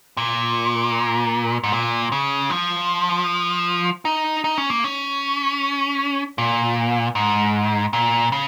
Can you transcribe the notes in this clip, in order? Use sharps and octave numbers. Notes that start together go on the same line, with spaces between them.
A#2
G#2
A#2
C#3
F3
D#4
D#4
C#4
A#3
C#4
A#2
G#2
A#2
C#3